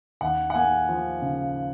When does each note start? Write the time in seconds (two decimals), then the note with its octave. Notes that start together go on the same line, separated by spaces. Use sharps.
0.21 D#2 F#5
0.50 F#5
0.55 A#3 G#5
0.89 F3
1.22 C#3